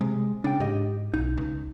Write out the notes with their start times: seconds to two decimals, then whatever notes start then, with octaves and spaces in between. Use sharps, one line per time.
0.01 C3 G#3
0.44 C#3 D4 G5
0.60 G#2 G4 D#5
1.14 B1 D#4
1.37 C#2